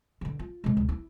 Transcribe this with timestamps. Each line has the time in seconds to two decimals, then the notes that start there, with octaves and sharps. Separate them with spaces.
0.21 D3 E3
0.39 F4
0.64 C3 G#3
0.77 D2
0.89 E4